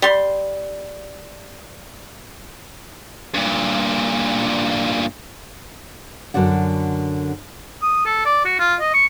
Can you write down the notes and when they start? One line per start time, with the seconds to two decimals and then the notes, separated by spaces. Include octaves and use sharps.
0.02 G3 C6
3.34 G2 A#2
6.34 F#2 D3 F#4 D5 F#5
7.82 D#6
8.05 A4
8.25 D5
8.45 F#4
8.59 F4
8.80 D#5
8.94 C#6